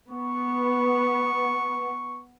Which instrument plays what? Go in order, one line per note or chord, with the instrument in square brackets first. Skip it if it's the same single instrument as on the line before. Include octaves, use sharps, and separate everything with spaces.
[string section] B3 [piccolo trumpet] C#6